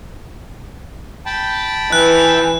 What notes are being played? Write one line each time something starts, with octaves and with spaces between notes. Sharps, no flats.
G5 A5 B5
E3 F#6